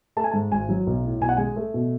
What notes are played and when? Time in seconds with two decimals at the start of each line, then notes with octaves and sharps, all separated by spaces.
0.17 A3 A5
0.24 G#5
0.31 G#2 A5
0.52 G#1 G#5
0.69 F#3
0.87 B1
1.04 A2
1.21 B1 G#5
1.29 F#5
1.37 G#3 G#5
1.56 A3
1.74 B2